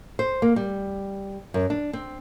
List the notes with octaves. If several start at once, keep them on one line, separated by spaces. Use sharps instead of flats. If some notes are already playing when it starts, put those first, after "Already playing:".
C5
A#3
G3
F#2
D4
C4